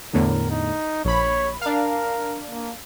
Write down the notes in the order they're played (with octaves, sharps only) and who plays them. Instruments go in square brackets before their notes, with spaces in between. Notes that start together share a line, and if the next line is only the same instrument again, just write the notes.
[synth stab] E2 A2 D3 [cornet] A#4
[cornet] D#4
[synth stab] A#1 B5 [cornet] C#5
[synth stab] D4 F5 [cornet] A#4
[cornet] A#3